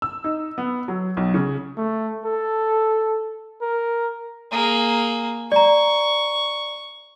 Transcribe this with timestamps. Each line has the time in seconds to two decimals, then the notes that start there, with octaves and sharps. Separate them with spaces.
0.02 E6
0.24 D#4
0.58 B3
0.88 F#3
1.17 B1
1.34 C#3
1.77 A3
2.25 A4
3.62 A#4
4.52 A#3 G#4
5.52 D5 A#5 C#6